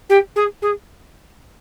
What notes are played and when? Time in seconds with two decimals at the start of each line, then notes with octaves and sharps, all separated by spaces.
0.09 G4
0.36 G#4
0.62 G#4